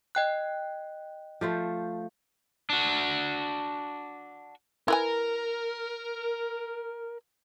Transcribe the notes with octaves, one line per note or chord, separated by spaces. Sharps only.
D#5 G5 F#6
F3 A3 C5
D4 F#4
E4 A#4 B4 G#5